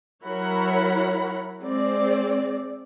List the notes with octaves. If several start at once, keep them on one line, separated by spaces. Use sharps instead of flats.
F#3 E4 A#4 C#5 F#5 B5
G#3 C4 D5